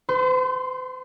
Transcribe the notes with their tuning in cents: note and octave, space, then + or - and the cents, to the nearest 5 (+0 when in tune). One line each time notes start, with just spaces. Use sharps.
C5 -45 C6 +0